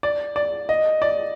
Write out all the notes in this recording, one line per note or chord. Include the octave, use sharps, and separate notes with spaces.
D5
D5
D#5
D5